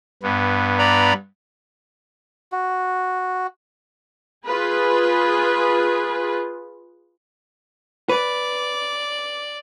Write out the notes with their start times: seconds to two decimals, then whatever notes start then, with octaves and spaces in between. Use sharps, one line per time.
0.23 G2 B3
0.79 D5 A#5 B5
2.52 F#4
4.48 F4 G#4 B4
8.09 B4 D5